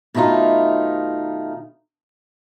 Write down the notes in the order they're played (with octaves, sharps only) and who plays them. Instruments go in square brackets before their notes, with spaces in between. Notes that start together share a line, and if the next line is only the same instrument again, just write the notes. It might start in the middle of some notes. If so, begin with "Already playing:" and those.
[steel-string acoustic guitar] B2 D#3 A3 D#4 F4